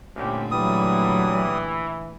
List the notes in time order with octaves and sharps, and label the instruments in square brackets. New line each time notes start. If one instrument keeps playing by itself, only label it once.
[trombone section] C2 C#4 G4 [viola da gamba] A#2 D3 A3
[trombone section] E3 [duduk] F#3 [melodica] G3 D#6